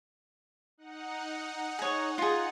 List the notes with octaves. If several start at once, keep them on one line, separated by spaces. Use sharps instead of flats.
D#4 F#5
G#4 C#5
F4 G#4